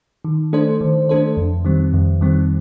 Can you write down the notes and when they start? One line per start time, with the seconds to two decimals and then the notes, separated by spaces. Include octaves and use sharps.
0.25 D#3
0.53 A3 D4 A4 C5
0.81 D#3
1.09 A3 D4 A4 C5
1.37 F2
1.65 D#3 G3 C4
1.93 F2
2.21 D#3 G3 C4